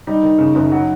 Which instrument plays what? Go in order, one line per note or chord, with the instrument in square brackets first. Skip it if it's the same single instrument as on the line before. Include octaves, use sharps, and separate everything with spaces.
[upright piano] G3 [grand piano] D#4
[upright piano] D#3
C#3
F#1
F#3